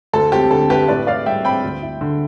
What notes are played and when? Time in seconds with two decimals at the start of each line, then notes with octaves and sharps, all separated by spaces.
0.13 D2 A4
0.32 C4 G4
0.51 D3 A4
0.70 A3 G4 B4
0.88 A2 B4 D5
1.07 A2 D5 F5
1.26 G3 E5 G5
1.45 C4 G5 B5
1.64 D2
1.82 E4
2.01 D3